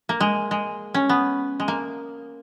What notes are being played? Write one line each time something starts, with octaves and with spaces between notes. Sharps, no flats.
A#3
G#3
G#3
C#4
B3
G#3
A#3